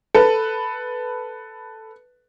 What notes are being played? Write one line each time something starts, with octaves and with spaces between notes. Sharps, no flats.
A4 B4